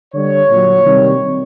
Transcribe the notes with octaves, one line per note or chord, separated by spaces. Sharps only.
D3 G3 C#5
A#2 F#3
C3 D#3 G3